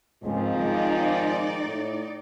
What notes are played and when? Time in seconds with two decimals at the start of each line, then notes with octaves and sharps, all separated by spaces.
0.24 C#2 G#2 D#3 F3 G#3 C4 F4
0.59 D#4 D5
1.64 A2